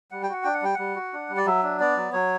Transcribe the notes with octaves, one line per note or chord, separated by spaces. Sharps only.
G3 F#5
G5
F#4 F#5
D4 G5
F#5
G3 G5
G3 F#5
F#4
D4
G3
D5
F#3 E5
D4
B3 D5
F#3
F#3 C#5